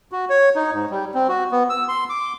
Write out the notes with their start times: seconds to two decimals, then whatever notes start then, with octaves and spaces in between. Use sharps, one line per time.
0.12 F#4
0.30 C#5
0.56 D#4
0.73 G#2
0.90 G3
1.14 C4
1.29 F#4
1.52 B3
1.70 E6
1.88 C6
2.10 D6